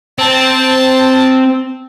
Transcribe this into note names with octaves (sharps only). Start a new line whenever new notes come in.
C4 A5